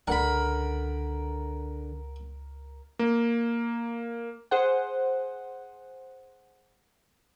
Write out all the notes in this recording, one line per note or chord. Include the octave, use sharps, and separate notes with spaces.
C#2 D3 C#4 A#4 D5 F#5 B5
A#3
G#4 C5 F#5